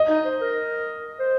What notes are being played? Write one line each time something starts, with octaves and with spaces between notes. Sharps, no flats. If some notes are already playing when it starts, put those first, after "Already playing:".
Already playing: D#5
D#4
C5
A#4
C5